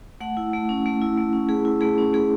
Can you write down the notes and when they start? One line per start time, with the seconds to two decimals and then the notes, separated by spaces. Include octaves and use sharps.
0.21 A3 F#5
0.37 E4
0.53 A3
0.69 C#4
0.86 A3
1.02 E4
1.18 A3
1.33 C#4
1.49 A3 G#4
1.65 E4
1.81 A3 G#4
1.98 C#4
2.13 A3 G#4